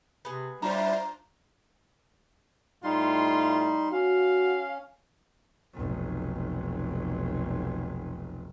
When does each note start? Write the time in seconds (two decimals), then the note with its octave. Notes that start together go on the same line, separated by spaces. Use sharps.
0.25 C3 B3 G#4
0.62 G3 A3 C#4 D4 E4 F4 C5 A#5
2.84 A2 G3 D#4 F4 C6
3.93 C#4 F#4 F5
5.74 F1 B1